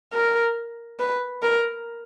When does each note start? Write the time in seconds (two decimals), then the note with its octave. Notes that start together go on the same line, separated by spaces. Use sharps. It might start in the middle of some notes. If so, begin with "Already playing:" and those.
0.13 A#4
1.00 B4
1.42 A#4